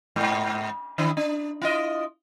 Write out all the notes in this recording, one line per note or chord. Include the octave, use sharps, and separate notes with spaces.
G#2
D#3 D4 E4
D4
E4 F4 D#5